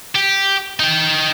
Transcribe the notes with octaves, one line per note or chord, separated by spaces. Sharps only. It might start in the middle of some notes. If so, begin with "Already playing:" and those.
G4
D#4 G5